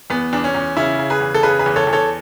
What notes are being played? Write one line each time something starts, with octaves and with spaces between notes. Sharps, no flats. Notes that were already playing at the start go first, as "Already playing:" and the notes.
E2 B3
E2 D4
C#4
E2
C#3 C#4 E4
C#3
G#4 B4
E2
A4
C#3 G#4 B4
G#4 B4
E2
A4 C#5
E2
A4 C#5